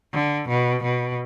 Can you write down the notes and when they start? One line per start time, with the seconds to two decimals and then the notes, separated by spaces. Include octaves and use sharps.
0.14 D3
0.49 B2
0.83 B2